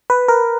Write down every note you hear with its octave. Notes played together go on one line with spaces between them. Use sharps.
B4
A#4